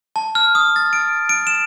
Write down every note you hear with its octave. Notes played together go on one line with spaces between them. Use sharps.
A5
F6
D#6
A6
D7
D7
E7